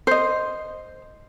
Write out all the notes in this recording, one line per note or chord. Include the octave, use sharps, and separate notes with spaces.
C5 D#5